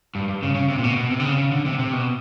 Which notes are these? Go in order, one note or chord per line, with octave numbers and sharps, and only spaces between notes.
G2
G2
C#3
C#3
C3
A#2
B2
B2
C3
D3
C#3
C#3
D3
C3
C3
B2